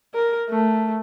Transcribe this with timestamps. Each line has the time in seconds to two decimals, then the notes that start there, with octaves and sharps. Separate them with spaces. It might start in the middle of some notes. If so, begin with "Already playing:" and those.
0.15 A#4
0.50 A3